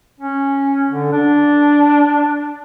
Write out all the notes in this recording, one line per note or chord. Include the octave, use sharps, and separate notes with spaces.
C#4
D3
D4